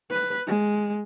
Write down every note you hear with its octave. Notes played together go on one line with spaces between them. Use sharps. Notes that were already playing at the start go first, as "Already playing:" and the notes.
B4
G#3